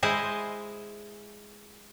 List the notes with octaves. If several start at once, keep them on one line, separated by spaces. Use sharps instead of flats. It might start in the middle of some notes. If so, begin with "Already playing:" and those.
G#3 E4 C5 D#5